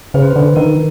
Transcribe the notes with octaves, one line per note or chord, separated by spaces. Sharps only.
C#3 B4
C5
B4
D3
D#3 A#4